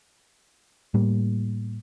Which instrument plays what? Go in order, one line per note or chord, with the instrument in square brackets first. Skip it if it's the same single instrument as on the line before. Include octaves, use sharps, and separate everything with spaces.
[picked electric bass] A2 G3 A#3